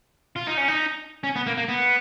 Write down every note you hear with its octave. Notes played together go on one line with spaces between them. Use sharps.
F4
D#4
C#4
D#4
C#4
B3
A#3
A#3
B3